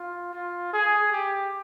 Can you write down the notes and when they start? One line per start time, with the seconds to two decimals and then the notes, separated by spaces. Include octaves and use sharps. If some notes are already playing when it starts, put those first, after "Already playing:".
Already playing: F4
0.33 F4
0.73 G#4
1.12 G4